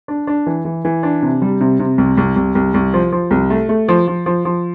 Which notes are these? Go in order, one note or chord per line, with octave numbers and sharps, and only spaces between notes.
D4
D4
E3
E3
E3
D4
C3
G3
C3
C3
C2
C2
C2
C2
C2
F3
F3
C2
A3
A3
F3
F3
F3
F3